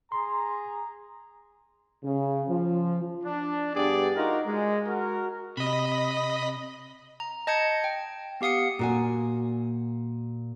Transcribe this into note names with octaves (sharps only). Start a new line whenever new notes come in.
G#4 A#5 C6
C#3
F3
D4
G2 B3 G4 G#4 D5
D#4 F4 F#4 A#4
G#3
F#4 A#4
C3 D#5 B5
A#5
D#5 A5 G6 G#6 C#7
G5
B3 G4 F5 D#6 C#7
A#2 F#4 G#5